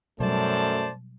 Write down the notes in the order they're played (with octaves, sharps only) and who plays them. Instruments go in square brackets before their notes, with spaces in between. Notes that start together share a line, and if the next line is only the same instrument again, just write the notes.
[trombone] F#2 [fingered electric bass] B2 F#3 G3 [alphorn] A3 [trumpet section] C5 D5 A5